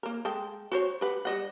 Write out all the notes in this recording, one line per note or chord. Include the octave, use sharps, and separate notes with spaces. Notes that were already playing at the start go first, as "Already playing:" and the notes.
A#3 A#4
G#3 A4 G5
F#4 C5 C#5
G4 B4 F#5
G3 D#5 F#5